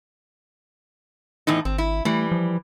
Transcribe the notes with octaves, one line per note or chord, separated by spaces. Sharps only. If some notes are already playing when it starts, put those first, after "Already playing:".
E2 A2 D#4
G#1 C4
E4
E3 G3 A3
F3